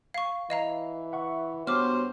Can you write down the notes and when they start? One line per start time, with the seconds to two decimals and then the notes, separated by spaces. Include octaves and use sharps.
0.14 F5 C#6
0.50 E3 D#5 F5 A#5
1.12 E5 F#5 C#6
1.67 G2 B3 F#4 C5 C#5 D6 F6